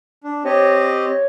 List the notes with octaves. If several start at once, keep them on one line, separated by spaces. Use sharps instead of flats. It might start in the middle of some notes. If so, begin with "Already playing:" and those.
D4
C4 G4 C#5 D#5